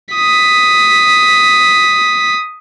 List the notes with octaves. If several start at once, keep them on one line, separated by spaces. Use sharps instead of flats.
D#6 B6